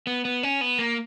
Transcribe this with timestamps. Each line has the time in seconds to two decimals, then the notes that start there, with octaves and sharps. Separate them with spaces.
0.07 B3
0.25 B3
0.43 C#4
0.61 B3
0.79 A#3